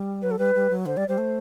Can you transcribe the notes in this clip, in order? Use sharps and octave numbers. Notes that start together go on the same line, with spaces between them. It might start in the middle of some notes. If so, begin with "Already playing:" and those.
Already playing: G3
F#3 B4
A4
G3 B4
G3
F#3
D3 C5
G3 D5
G3 C5
A3